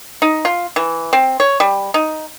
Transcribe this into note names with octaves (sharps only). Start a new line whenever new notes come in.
D#4
F4
E3
C4
C#5
G3
D#4